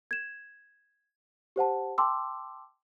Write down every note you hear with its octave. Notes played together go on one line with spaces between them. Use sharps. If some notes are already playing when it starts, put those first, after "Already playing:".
G#6 E7
G4 C5 F#5 A5
G5 A5 C6 D6 E6